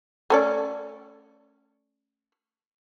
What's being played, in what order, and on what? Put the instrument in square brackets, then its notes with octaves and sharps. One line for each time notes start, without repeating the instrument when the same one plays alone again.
[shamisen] A3 C#4 D5